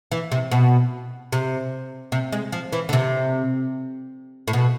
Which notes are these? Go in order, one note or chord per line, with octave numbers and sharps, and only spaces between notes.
E3
C3
B2
C3
C3
G#3
F3
E3
D3
C3
A2
B2